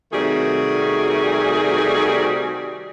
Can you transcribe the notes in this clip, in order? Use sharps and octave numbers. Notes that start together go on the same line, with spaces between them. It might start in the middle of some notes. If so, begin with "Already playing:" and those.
C3 D#3 G3 A3 F#4 G#4